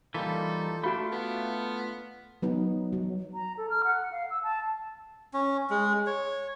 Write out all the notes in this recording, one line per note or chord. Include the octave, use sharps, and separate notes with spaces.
E3 G3 A#3 D#4 F4 A4 B6
A3 D4 F4 F#4 F5 B5
B3
F#3 B3 D#4
F#3
A#5
A4
F6
F#5
F5
E6
A5
C#4
G#3
C#5